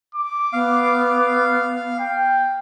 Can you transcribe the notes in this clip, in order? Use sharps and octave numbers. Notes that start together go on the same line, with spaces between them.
D6
B3 F5
G5